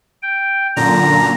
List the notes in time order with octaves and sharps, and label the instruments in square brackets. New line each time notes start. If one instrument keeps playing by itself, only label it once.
[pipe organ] G5
[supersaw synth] F#2 A#2 D3 [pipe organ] A#5